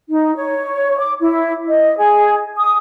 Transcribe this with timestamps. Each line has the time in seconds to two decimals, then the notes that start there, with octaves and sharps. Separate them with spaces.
0.10 D#4
0.36 C#5
1.00 D6
1.21 E4
1.67 D#5
1.97 G#4
2.57 D#6